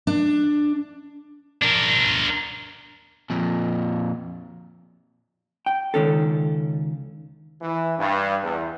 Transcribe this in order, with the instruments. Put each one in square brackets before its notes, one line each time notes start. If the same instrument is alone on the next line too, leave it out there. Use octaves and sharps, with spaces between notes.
[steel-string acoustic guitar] D4
[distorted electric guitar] D4 A#4
[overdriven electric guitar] F2 A#2
[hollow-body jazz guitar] G5
C#2 D#3 C#4 A4
[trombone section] E3
G2
E2